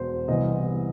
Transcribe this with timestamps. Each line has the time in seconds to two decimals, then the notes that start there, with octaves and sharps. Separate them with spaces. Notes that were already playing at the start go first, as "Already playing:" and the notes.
Already playing: E1 B2 C5
0.28 C2 C3 E3 B3 D#5